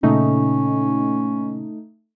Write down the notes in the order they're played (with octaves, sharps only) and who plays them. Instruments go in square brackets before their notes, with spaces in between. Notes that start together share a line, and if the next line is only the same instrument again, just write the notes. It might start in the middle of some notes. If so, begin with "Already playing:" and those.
[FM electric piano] A#2 C#3 [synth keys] A3 D#4 [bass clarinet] C#4